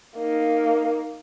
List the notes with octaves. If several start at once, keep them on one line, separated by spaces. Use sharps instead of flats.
A#3 D#4